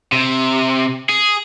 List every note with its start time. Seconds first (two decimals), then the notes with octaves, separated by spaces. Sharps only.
0.12 C3
1.09 G#4